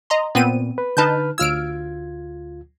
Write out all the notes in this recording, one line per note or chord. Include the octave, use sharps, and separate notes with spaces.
D#5 A#5 C6
A#2 B3 C4 D#7
B4
D3 D#4 B4 A5 F6 G6
D2 F4 E6 F6 G#6 D7